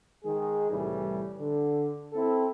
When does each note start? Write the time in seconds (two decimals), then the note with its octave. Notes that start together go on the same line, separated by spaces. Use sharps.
0.24 D#3 G#3 G#4
0.71 C2 A2 E3 G3
1.39 D3
2.13 C4 E4 A4